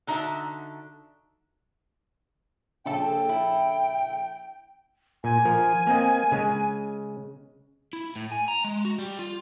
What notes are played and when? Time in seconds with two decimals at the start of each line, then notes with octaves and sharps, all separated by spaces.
0.07 D3 D#4 F#4 E5 A5
2.86 A#1 C#3 A4 G5
3.29 E4
5.24 A#2 G#5
5.45 F3 A#4
5.87 A#3 C4 D#5
6.32 C#3 G#3
7.93 E4
8.16 A2
8.32 G#5
8.48 A#5
8.64 G#3
8.85 F#4
8.98 G3
9.19 F4